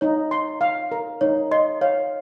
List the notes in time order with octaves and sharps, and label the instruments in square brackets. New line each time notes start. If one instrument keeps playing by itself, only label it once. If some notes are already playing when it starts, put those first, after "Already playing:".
[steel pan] D#4 [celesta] C#5
[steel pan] C6
F5
A#4
[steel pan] D#4 [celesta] C#5
[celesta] D#5 [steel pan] C6
[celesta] C#5 [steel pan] F5